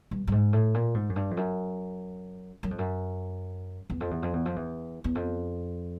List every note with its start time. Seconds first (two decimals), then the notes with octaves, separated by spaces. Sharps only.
0.11 G2
0.27 G2
0.32 G#2
0.53 A2
0.74 A#2
0.94 G#2
1.09 F#2
1.16 G2
1.31 F2
1.37 F#2
2.63 F#2
2.71 F2
2.78 F#2
3.90 E2
4.00 F2
4.11 E2
4.22 F2
4.33 E2
4.45 F2
4.56 E2
5.04 E2
5.15 F2